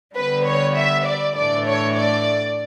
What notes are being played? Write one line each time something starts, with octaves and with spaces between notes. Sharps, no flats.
D3 G3 B3 B4
C#5
E5
D5
A2 E3 A3 D4 D5
C#5
D5